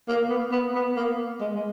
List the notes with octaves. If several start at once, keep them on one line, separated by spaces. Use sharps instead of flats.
A#3
B3
B3
B3
A#3
G#3
G#3